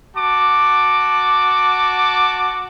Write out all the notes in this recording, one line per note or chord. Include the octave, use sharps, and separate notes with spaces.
F#4 A5 D6